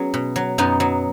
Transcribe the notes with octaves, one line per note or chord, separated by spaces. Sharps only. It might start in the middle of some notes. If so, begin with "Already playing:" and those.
Already playing: F#3 B3 C#4 F#4 G#4
B2
F#3
F#2 B3 D#4
F#3